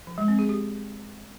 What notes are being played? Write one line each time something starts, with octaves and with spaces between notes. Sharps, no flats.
F3
G#3
C4
G#4
G4